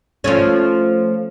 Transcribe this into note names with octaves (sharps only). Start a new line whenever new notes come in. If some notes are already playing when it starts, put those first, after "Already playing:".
F3 A3 C#4